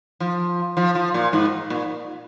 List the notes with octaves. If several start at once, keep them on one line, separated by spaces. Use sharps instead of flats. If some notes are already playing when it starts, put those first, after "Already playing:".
F3
F3
F3
A#2
G#2
A#2